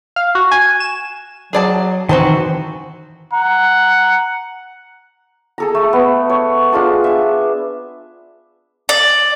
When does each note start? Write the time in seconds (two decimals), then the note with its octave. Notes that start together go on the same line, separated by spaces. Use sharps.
0.16 F5
0.35 F#4
0.51 G#5
0.80 E7
1.53 F#3 G#4 D5 A5
2.09 D#3 E3 C4 F#4 C5 A5
3.33 F#5 A#5
5.58 G#4 A4 A#5
5.75 A3
5.93 B3
6.30 C#5
6.72 D4 F4 G#4 A5
7.04 G#4 E5
8.89 D5